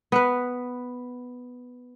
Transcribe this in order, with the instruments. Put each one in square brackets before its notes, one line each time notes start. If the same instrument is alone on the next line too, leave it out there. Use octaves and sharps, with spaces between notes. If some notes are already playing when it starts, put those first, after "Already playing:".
[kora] B3 B4